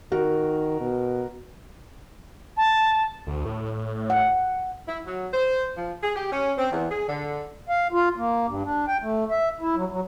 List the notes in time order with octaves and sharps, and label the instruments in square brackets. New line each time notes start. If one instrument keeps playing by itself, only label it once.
[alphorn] D#3 [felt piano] F#4 A#4
[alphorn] B2
[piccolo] A5
[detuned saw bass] D2
A2
[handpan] F#5
[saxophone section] E4
F#3
C5
F3
G#4
G4
C#4
C4
E2
G#4
D3
[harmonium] F5
F4
A#3
G2
D4
G5
A3
E5
E4
F#3
F#3